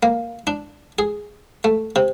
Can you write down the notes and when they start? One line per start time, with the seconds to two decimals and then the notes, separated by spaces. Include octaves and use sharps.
0.03 A#3
0.47 D4
0.99 G#4
1.64 A3
1.96 C3